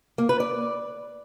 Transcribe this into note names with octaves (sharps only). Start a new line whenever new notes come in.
A#3
B4
D5